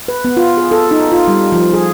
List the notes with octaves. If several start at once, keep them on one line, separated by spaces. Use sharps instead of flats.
B4
B3
F4
G#4
A4
D#4
F4
G3
F3
G#4